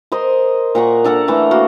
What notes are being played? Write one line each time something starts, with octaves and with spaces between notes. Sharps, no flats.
A#4 C5 D#5 C6
A#2 F#5 A#5 C#6
D4 A4 A#4 F#5
E3 A3 A#5
A#3 F#4 A4